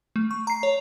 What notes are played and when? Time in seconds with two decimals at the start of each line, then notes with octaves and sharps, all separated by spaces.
0.16 A3
0.31 C#6
0.47 A#5 C7
0.63 C#5